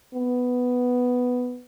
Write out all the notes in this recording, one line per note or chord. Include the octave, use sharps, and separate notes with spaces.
B3